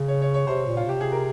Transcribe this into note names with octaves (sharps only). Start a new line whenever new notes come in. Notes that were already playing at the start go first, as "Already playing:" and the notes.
Already playing: C#3
C#5
C#5
C#5
C3 C5
A#2
F4
C3 G4
G#4
A#4